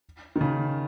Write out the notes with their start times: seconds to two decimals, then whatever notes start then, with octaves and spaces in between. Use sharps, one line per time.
0.36 D#3
0.41 C#3